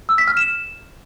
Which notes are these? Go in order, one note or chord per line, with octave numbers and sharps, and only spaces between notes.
E6
B6
F6
E7